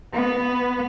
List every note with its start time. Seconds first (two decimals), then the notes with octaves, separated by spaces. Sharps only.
0.14 B3